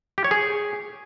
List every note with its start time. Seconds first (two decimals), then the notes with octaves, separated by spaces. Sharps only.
0.18 G4
0.24 C#5
0.31 G#4